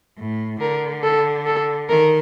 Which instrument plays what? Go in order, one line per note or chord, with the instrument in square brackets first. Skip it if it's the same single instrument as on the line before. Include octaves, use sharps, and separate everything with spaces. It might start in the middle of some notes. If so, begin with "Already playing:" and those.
[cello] A2
[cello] D3 [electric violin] A#4
[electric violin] A4
A4
[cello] D#3 [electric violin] A#4